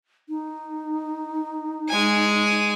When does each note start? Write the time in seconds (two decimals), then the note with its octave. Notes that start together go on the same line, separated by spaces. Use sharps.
0.29 D#4
1.89 G#3 G#5